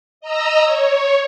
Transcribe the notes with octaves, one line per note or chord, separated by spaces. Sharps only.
D#5 A#5 E6
C#5